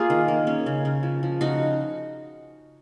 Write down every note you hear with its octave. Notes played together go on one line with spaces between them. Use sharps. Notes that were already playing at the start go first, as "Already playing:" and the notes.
Already playing: A#3 F4 G#4 A#4
D#3
A#3
C#4
C#3
C#3
F3
F3
C#3 D#4 F#4